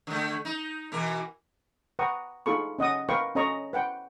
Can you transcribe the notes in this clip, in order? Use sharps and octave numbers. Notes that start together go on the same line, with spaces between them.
D3 A3
D#4
B2 E3 A#4
B4 F#5 G5 A#5 C#6 D#6
D#4 F4 G#4 A4 B5 C#6
C#4 D#5 F#5 D#6
A#4 B4 F5 G5 C#6
C#4 A4 C#5 D#5 A#5 C#6
B4 F#5 G5